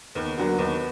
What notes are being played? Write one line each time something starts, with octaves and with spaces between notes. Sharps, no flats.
D#2 B3
D3 F#3 A#3
D#2 B3